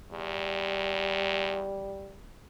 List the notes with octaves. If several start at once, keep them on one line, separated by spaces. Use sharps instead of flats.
E2 G3